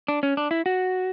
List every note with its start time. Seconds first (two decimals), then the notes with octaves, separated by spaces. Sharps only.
0.08 D4
0.23 C#4
0.37 D4
0.51 E4
0.66 F#4